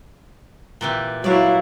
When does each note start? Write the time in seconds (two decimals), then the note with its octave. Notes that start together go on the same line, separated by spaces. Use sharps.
0.81 A#2 E3 G4
1.24 F#3 E4 D5 F5